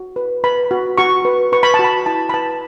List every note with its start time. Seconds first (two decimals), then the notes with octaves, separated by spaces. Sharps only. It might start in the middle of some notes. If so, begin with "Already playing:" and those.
Already playing: F#4
0.16 B4
0.44 B4 B5
0.71 F#4
0.98 F#4 C#6
1.25 B4
1.52 B4 C#6
1.63 B5
1.74 A5
1.79 F#4
1.84 B5
2.06 E4 A5
2.29 B5
2.34 B4 A5